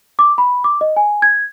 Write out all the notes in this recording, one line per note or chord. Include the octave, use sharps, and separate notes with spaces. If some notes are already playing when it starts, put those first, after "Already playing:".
D6
B5
D6
D#5
G#5
G#6